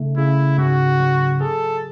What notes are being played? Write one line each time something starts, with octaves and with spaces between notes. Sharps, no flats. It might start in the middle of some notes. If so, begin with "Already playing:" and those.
Already playing: C#3 A3 D#4
C#3 E4
G#2 F#4
F#3
G#4 A4